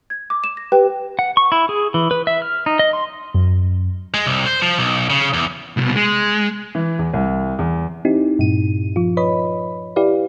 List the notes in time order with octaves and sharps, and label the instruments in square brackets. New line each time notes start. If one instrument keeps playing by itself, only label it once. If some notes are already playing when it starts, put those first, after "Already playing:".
[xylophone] G#6
D6
E7
A#6
G4 B4 G5
[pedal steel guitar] F#5
C#6
E4
G#4
E3
B4
E5
F6
D#4
D#5
C6
[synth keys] F#2
[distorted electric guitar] G#3
C2
C5
F3
B1
C#3
E2
[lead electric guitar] C2 B2
G#3
[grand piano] E3
E2
C2
E2
[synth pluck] C4 D#4 E4 G4
G2 A#2 D#7
F3 F4
B4 C#5 D#5 B5
E4 G4 B4 D5 F5